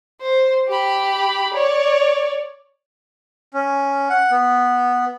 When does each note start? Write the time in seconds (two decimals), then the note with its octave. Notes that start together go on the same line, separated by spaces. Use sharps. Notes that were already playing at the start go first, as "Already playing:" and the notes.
0.21 C5
0.68 G4 B5
1.54 C#5 D5
3.54 C#4
4.10 F#5
4.31 B3